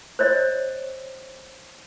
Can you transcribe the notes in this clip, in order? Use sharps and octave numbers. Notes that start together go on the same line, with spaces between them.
C5 C#5 D#5